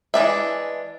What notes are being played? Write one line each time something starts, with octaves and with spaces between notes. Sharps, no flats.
E3 G#3 D4 E5